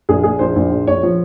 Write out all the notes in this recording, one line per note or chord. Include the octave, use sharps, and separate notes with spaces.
A#1 G#4
A#2 G#4
A#1 C5
A#1
A#1
A#1 C#5
F3